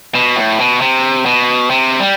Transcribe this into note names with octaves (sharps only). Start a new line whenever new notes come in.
B2
A2
B2
C3
B2
C3
G3